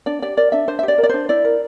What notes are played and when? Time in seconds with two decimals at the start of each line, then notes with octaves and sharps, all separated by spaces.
0.06 D4 D5
0.22 G4 D5
0.37 A#4 D5
0.52 D4 E5
0.68 D4 C5
0.79 E5
0.83 G4 D5
0.98 A#4
1.03 D5
1.09 D4 C5
1.29 E4 D5
1.45 A#4